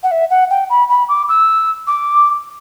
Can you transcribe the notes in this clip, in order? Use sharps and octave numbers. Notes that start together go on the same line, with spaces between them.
F#5
E5
F#5
G5
B5
B5
D6
E6
D6